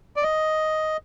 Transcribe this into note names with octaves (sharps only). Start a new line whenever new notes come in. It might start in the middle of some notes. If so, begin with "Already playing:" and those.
D5
D#5